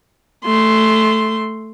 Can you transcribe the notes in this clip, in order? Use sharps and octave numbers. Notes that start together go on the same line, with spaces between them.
A3 C6